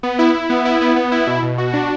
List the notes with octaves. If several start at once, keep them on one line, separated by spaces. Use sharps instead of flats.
B3
E4
E4
B3
E4
B3
B3
E4
B2
B2
F#4
D4